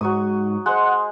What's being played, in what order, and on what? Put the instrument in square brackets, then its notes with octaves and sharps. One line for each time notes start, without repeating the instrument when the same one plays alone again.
[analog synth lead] G#2 [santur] F#3 C#6 D#6
[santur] G#3 C5 [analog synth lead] F#5